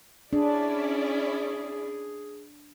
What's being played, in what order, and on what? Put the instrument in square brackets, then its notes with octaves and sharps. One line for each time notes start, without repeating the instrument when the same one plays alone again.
[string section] C#4 E4 D5 [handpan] D4 [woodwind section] G#4